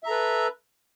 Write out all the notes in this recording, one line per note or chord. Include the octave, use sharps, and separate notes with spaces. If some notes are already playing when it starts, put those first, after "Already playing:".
A4 B4 E5 A#5